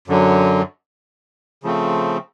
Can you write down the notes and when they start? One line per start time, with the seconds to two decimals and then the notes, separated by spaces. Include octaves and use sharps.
0.08 F#2 D3 F#3
1.63 C#3 F3 A3 C4